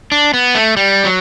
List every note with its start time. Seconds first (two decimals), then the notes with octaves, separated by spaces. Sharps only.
0.12 D4
0.34 B3
0.55 A3
0.77 G3
1.05 F#3